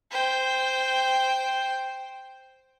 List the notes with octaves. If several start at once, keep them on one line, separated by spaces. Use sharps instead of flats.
C5 G5